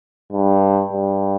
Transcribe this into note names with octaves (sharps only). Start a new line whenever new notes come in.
G2
G2